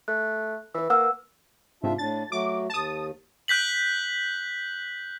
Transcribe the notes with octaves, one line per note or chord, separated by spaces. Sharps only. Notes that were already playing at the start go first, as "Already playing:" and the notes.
A3 F#6
E3 B4 E6
A#3 F#5 E6 F6
G#2 C3 D4 F4 E5
A2 D4 A6
F#3 A3 F#4 D6
D#2 A5 D#6
F#6 G6 B6 F#7